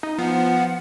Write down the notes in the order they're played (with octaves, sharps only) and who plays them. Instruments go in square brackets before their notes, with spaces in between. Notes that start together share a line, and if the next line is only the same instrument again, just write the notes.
[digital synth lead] D#4
[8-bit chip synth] F3 B3 [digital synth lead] F4 [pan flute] F#5